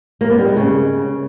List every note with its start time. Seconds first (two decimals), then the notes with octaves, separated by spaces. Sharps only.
0.21 A#3
0.30 B3
0.39 G3
0.48 G#3
0.57 C#3